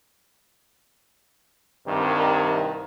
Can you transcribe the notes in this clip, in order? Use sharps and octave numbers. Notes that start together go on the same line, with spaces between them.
C2 G2 C3 D#3